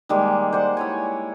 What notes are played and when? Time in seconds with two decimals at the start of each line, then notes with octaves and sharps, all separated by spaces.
0.09 D#3 G3 G#3 A#3
0.53 C5 D5 F#5
0.77 E4 C#5 G#5